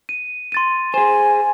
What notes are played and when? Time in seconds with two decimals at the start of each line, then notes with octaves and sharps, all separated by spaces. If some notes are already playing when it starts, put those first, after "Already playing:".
0.09 D#7
0.52 C6 A6 D#7
0.94 G#4 C5 G#5